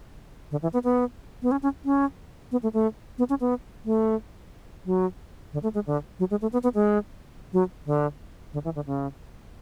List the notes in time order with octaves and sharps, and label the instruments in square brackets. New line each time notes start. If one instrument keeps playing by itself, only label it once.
[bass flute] D3
E3
B3
B3
B3
C#4
C#4
C#4
B3
A3
A3
B3
C#4
B3
A3
F#3
D3
A3
G#3
D3
F#3
G#3
A3
B3
B3
G#3
F#3
D3
D3
E3
D3
C#3